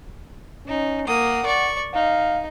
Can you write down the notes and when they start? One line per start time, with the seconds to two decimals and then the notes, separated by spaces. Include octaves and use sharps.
0.68 C#4 D#4
1.07 A#3 F#5 D#6
1.45 D5 C#6
1.94 D#4 F5